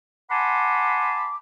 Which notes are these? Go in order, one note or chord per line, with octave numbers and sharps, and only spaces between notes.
F#5 G#5 A5 B5 C6 D6